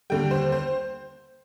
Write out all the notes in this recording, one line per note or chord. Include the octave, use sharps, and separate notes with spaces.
D#2 D3 G3 G5
C5
C5